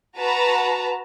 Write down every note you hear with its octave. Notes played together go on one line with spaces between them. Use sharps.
F#4 B4 A5 A#5